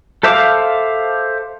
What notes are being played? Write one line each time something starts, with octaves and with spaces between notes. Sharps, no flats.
A4 C5 E5 F5 D6